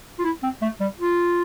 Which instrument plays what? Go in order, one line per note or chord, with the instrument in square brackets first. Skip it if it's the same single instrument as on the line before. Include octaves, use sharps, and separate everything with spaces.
[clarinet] F4
E4
C4
A3
G3
F4